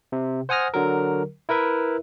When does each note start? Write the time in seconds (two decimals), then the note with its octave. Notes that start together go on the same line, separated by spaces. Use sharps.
0.12 C3
0.49 C5 F#5 G#5 D#6 F6 A#6
0.74 D3 F#3 A#4
1.49 E4 A#4 B4 E5